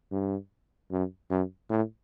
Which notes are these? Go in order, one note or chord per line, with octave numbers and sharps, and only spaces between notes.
G2
F#2
F#2
A2